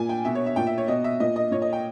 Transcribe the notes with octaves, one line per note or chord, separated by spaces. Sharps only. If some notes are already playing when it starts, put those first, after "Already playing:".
Already playing: A#2 G#5
G5
B2 E5
C#5
E5
A#2 G5
E5
C#5
B2 D#5
E5
A#2 D#5
D#5
A#2 C#5
D#5
G5